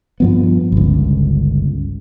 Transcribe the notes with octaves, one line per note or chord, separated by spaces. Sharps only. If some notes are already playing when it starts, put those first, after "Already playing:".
G2 F3 B3
G1 C#2